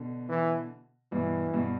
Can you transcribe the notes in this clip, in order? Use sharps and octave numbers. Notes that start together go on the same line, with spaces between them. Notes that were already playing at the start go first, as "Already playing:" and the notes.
Already playing: B2 D3
E3
G2 B2 E3
G2 B2